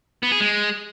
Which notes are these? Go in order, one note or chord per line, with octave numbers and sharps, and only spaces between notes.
B3
G#4
G#3